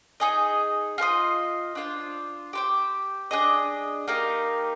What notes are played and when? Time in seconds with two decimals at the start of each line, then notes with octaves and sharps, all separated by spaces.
0.20 D#4 G#4 D#5
0.98 F4 G#4 C5 D#5
1.75 D4 F4 C5
2.53 G4 C5 G5
3.31 D4 G#4 D#5
4.08 A#3 D#4 G4 A#4